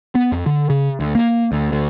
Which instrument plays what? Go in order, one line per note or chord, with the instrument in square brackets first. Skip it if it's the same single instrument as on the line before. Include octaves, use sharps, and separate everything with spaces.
[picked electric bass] B3
F2
D3
C#3
D2
A#3
D2
D2